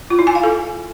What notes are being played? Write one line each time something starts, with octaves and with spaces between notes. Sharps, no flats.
F4
E4
G#5
F5
A4